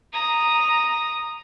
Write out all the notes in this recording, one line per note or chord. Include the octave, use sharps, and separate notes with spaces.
A#5 D#6